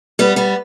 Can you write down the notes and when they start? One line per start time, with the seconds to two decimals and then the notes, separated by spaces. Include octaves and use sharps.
0.19 G3 B3
0.36 G3 B3